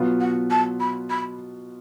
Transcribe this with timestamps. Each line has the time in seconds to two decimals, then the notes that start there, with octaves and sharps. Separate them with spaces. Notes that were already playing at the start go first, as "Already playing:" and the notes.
Already playing: B2 F#3 B3 F4
0.21 F#5
0.51 A5
0.80 B5
1.10 B5